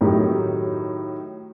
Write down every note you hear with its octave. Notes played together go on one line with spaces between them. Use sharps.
A2 D#3 F#3 D#4 F#4 G4